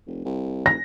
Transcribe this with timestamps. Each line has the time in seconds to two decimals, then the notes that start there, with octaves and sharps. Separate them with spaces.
0.07 F1
0.25 C2
0.66 F1 A#6